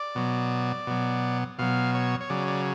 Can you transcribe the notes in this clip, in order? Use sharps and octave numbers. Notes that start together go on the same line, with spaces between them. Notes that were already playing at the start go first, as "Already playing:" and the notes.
Already playing: D5
B2 F#3
B2 F#3
B2 F#3 F5
C#5
C#5
C#3 F#3 D5
D5